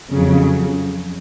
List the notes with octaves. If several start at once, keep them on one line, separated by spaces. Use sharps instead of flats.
F2 C#3 F#3